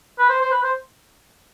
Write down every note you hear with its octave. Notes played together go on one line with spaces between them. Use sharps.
B4
C5
C5
B4
C5